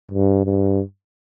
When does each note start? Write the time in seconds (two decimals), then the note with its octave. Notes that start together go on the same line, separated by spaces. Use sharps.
0.11 G2
0.45 G2